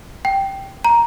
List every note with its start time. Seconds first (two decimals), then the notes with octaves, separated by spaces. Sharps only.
0.25 G5
0.85 A#5